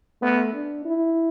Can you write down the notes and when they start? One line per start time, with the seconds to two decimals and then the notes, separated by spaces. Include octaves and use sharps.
0.21 A3 B3
0.53 D4
0.85 E4